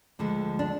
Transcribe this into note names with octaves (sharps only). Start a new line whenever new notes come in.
D2 D3 F3 G#3
D4